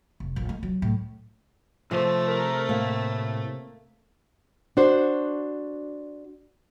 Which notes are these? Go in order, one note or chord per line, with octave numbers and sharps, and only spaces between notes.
F1
A#1
G#3
F#3
A2
C3 F3 A3 C5
A#4
A2 A#3
D4 F#4 C5